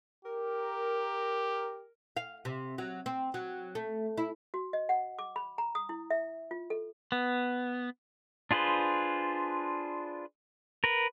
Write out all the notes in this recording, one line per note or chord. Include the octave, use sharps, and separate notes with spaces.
G4 A#4
F5
C3
F#3
C4
F#3
A3
E4
F#4
D#5
F#5
D6
B5
A#5
D#6
E4
E5
F4
A4
B3
D4 F4 G#4 B4 C5
A#4 B4